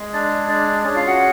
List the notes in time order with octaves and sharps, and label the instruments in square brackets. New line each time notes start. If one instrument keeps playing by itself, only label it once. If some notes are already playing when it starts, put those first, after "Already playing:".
Already playing: [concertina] G#3 G#4
D4 D5
D4 D5
C#4 D4 G#4 D5
F4 F5
F#4 F#5